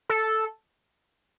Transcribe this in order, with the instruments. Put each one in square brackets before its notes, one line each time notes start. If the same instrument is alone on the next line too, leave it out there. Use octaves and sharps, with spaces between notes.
[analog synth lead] A4